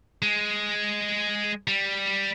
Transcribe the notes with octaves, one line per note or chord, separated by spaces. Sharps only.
G#3
G3